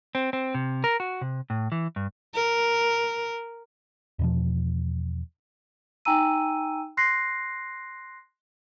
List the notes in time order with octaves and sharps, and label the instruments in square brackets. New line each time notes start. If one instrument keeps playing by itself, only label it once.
[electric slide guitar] C4
C4
C3
A#4
F#4
C3
A2
E3
G2
[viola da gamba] A#4
[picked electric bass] E2 B2 F3
[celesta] D#4 G5 G#5 A#5 E6 D#7
C6 F#6 A#6 C7